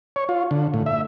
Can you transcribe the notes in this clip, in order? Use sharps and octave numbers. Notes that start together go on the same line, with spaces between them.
C#5
F4
D3
A2
E5